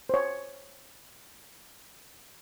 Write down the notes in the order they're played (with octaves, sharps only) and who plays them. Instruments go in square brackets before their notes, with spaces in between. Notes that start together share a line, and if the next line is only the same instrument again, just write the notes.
[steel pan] C5 C#5